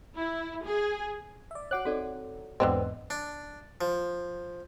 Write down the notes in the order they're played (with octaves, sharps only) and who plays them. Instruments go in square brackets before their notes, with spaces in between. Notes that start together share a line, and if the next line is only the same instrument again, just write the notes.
[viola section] E4
G#4
[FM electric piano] D5 E5
[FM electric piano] F#4 D6 F#6 [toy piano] C#5 F#5
[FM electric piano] C4 D#4 [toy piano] F#4 A4 D5
[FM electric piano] E2 G#2 [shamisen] D3 B3 C4 [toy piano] B4 D#5
[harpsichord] D4
F3